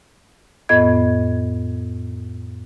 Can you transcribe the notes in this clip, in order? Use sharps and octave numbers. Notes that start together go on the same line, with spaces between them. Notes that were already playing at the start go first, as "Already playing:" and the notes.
F2 A2 B3 D#5 G#6